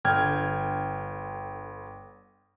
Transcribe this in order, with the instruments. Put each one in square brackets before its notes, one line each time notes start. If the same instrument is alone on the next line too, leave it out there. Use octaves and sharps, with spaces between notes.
[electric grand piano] G1 D3 G5 F6 G#6